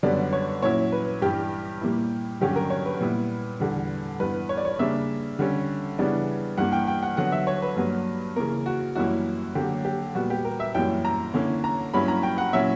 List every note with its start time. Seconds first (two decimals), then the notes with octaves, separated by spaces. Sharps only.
0.03 F#2 D3 G3 B3 D5
0.33 C#5
0.62 A#2 F#3 C#4 E4 C#5
0.92 B4
1.22 G2 E3 G3 G4
1.81 A#2 G3 A#3 E4
2.41 G2 D3 F#3 C#4 G4
2.56 A#4
2.70 C#5
2.86 B4
3.00 A#2 G3 B3 E4
3.60 E2 D3 G3
4.20 G2 E3 B3 B4
4.49 C#5
4.57 D5
4.65 C#5
4.79 C#3 G3 A#3 D4 E5
5.39 D3 G3 C#4
5.99 C#3 E3 G3 B3 D4
6.58 G2 E3 A#3 F#5
6.72 G5
6.87 G5
7.03 F#5
7.17 D3 F#3 B3 F#5
7.32 E5
7.47 C#5
7.62 B4
7.77 G2 F#3 A#3
8.36 C#3 E3 A#3 A#4
8.66 F#4
8.95 F#2 E3 G3 A#3 E4 F#4
9.55 D3 F#3 A#3 G4
9.85 G4
10.15 A#2 G3 B3 F#4
10.30 G4
10.45 A#4
10.60 E5
10.74 F#2 E3 G3 A#3 G5
11.05 A#5
11.34 D3 A#3 C#4 E4
11.64 A#5
11.94 G2 F#3 A#3 C#4 E4 B5
12.08 A#5
12.23 G5
12.38 F#5
12.53 A#2 F#3 C#4 E4 E5